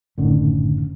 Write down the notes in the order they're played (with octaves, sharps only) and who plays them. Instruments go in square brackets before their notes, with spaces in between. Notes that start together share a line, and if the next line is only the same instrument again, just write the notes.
[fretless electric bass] F#1 C#4 [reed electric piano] A2 D3 D#3